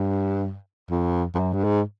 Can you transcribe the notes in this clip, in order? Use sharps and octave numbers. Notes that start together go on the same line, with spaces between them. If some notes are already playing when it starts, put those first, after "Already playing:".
Already playing: G2
F2
F2
F#2
G2
G#2